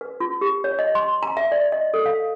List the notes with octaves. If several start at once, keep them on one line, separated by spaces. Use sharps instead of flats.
B4
F4
G4
C#5
D#5
C6
A#5
E5
D5
D#5
A4
F5